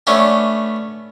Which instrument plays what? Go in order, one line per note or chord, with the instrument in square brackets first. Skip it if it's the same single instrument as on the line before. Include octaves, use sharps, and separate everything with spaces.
[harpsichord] A3 B3 C#4 D4